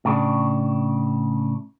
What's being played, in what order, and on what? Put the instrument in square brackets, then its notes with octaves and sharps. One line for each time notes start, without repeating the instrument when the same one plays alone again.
[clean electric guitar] A2 C#3 D4